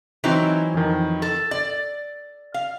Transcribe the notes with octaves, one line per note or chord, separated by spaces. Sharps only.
E3 F#3 C4 D#4 E4
F2 D#3
A4
D5 A6
F5